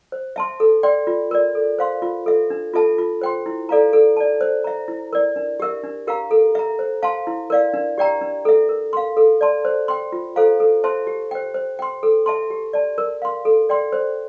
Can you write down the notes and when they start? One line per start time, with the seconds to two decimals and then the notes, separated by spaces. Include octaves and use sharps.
0.12 C5
0.36 E5 A5 C6
0.60 A4
0.83 D5 G5 C6
1.07 F4
1.31 A#4 D5
1.55 A4
1.79 C5 F5 C6
2.02 F4
2.26 A4 E5
2.50 D4
2.74 F4 A4 E5 A5
2.98 F4
3.21 C5 G5 C6
3.46 E4
3.69 A4 D5 F5 A#5
3.93 A4
4.17 D5 A5
4.41 C5
4.64 E5 A#5
4.88 E4
5.13 A#4 D5
5.36 D4
5.60 G4 A#4 E5
5.84 D4
6.07 G4 A#4 F5 A#5
6.31 A4
6.55 E5 A#5
6.79 C5
7.03 F5 A5 C6
7.27 E4
7.50 A#4 D5 F5
7.74 D4
7.98 G4 D5 G5 A#5
8.21 D4
8.45 A4 E5
8.69 A#4
8.93 F5 C6
9.17 A4
9.41 D5 A5 C6
9.65 C5
9.88 G5 C6
10.12 F4
10.36 A4 C5 F5 A#5
10.60 A4
10.84 C5 E5 A5 C6
11.07 G4
11.31 C5 G5
11.54 C5
11.79 G5 C6
12.03 A4
12.26 E5 A5 C6
12.50 G4
12.73 D5 A5
12.98 A#4
13.22 F5 C6
13.45 A4
13.69 D5 G5 C6
13.92 C5